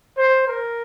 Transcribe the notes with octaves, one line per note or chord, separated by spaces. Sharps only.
C5
A#4